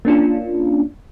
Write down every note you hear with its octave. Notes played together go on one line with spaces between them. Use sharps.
A#3 C#4 D4 F4